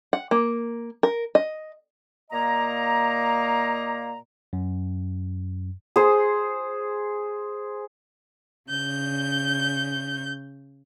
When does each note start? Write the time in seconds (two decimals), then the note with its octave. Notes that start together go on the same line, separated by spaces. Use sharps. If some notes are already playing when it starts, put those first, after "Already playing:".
0.13 F#5
0.31 A#3
1.03 A#4
1.35 D#5
2.31 A#2 A#3 D#5 A#5
4.53 F#2
5.96 G#4 C5
8.70 C#3 G6